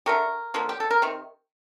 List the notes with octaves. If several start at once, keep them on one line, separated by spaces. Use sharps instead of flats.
D3 A3 G4 A#4
D3 F3 A#3
G4
A4
A#4
C3 D#3